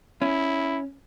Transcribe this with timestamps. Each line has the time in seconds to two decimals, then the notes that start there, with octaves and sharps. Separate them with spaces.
0.22 C#4 E4